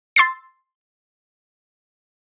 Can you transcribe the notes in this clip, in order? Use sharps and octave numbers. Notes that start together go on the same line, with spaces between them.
C6 E6 A6 C7